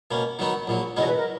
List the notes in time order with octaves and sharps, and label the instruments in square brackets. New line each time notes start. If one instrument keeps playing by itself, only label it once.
[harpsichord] B2 A#3 C#4
D#3 F#3 B3 D#4 F#4
A#1 A#2 F#3
[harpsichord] E2 B2 F#3 C#4 [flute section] D#5
[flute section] B4
A#4